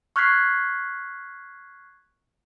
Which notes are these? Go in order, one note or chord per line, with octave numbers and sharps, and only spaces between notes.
C#6 F6 F#6 G#6 B6 C7